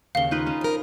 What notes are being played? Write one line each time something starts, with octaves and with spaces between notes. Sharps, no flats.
D#2 C#3 F5 G7
D#4 F4 B4
C#4
F3 A#4